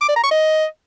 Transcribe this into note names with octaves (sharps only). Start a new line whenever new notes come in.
D6
D5
A#5
C#6
D#5